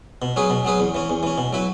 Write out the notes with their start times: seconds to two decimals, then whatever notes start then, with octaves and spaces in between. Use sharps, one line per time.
0.22 B2
0.36 F#3 C#4 G#4 B4
0.50 B2
0.65 F#3 C#4 G#4 B4
0.80 E2
0.95 E3 C#4
1.09 E2
1.23 E3 C#4
1.38 B2
1.53 F#3 E4 B4